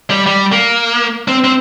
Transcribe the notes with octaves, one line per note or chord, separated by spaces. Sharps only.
G3
G3
A#3
C4
C4